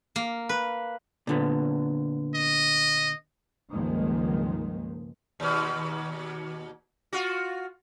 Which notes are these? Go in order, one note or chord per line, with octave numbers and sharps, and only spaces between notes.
A#3
B4
A#2 D3 B3
D#5
C#2 G2 D#3 F3 G#3 A#3
D#2 B2
F4 F#4